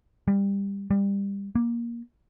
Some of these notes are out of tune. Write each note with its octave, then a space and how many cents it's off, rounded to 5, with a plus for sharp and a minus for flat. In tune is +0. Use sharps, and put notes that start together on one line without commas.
G3 +20
G3 +25
A#3 +15